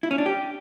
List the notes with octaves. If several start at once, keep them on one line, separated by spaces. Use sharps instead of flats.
E4
C#4
D4
G4